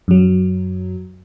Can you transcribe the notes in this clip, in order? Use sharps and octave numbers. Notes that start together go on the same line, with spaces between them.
F#2 F#3